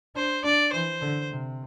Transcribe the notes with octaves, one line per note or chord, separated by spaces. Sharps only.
D4 C5
D4 D5
E3 C5
D3
C3